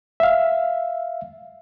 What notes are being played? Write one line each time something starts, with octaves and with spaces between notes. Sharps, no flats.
E5 F5